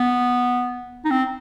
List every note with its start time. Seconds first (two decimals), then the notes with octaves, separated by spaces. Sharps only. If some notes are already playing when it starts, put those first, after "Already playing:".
Already playing: B3
1.05 D#4
1.11 C4